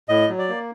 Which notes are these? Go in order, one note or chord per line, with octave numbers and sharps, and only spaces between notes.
A2 D#5
F#3
D5
A#3